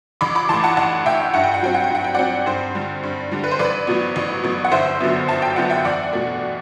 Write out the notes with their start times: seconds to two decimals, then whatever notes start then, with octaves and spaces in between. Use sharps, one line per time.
0.21 A1 B5 D6
0.35 B5 D6
0.49 A2 E3 A5 C6
0.64 F#5 A5
0.77 A1 F#5 A5
1.06 A2 E3 E5 G5
1.34 G2 F#5
1.43 G5
1.54 F#5
1.62 F#3 C4 G5
1.74 F#5
1.84 G5
1.90 G2 F#5
2.04 G5
2.15 F#3 C4 D5 F#5
2.46 G2 C5
2.75 D3 G3
3.03 G2
3.32 D3 G3
3.44 B4
3.51 C5
3.59 A1 B4 D5
3.87 A2 F#3 B3
4.16 A1
4.43 A2 F#3 B3
4.65 F#5
4.72 G1 C5 E5
5.00 F#2 D3 F#3 B3
5.28 G1 A5
5.42 G5
5.56 F#2 D3 F#3 B3 F#5
5.70 E5 G5
5.85 E2 D5 F#5
6.13 B2 A3